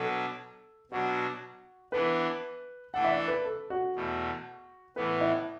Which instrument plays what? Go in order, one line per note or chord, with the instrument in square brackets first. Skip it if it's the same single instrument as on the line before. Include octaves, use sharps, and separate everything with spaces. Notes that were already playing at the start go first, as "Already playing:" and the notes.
Already playing: [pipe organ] B2 F#3 D4 B4 [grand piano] A4
[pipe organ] B2 F#3 D4 [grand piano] F#4
[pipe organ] E3 B3 D4 [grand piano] B4
[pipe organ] E3 A3 D4 A4 [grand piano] F#5
[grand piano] E5
D5
B4
A4
F#4
[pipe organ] E2 B2 A3
[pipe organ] A2 E3 B3 [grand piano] B4
[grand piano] E4